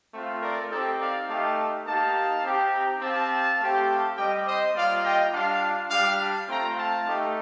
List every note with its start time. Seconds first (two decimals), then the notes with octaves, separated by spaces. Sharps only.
0.13 A3 C4 F4
0.42 A#4 D5
0.71 C4 D#4 G4 A4
1.00 D5 F5
1.28 A3 D#4 G4 F5 A5
1.86 A#3 D#4 G4 F5 A5
2.44 C4 D#4 G4
2.73 G5 A#5
3.02 C4 G4 F5 A5
3.60 A3 C4 G4
3.89 F5 A5
4.17 G3 C4 G4 D#5 G5
4.46 C5 D#5
4.74 G3 A#3 F4 D5 F5
5.04 D#5 G5
5.32 G3 D4 F4 F5 A5
5.90 G3 D4 G4 D5 F5
6.19 F5 A5
6.48 A3 C4 F4 G5 A#5
6.76 F5 A5
7.06 A3 D#4 G4